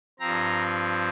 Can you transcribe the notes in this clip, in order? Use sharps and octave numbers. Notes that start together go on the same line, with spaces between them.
G2 F3 C4 A#5